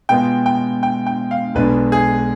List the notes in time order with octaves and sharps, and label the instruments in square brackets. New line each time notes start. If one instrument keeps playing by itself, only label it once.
[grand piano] B2 G#3 B3 F4 [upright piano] G5
[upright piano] G5
G5
G5
F5
[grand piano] B1 B2 G#3 D4 [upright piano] B4
[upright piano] G#4